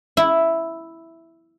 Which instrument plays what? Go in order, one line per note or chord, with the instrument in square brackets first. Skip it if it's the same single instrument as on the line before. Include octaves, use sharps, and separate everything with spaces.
[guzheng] E4